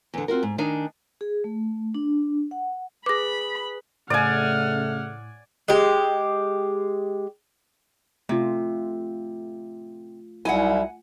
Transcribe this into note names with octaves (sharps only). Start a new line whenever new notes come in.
E2 D3
C4 F4 F#4 A#4
G#2
D#3 D4 D#4 G#5
G#4
A3
D4
F#5
G#4 B4 B5 D6 A#6
A2 C#3 A3 D5 F#5 G#5 F6
G#3 G4
C3 A3 F4
C2 F#3 D#4 E4 F#5 G#5